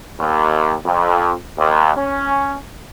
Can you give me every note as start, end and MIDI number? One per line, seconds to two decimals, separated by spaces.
0.20 0.74 39
0.85 1.32 41
1.57 1.90 39
1.97 2.55 61